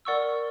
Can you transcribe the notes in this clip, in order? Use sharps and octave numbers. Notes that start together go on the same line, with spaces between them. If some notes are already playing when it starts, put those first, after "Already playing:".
A#4 D5 F#5 C#6 E6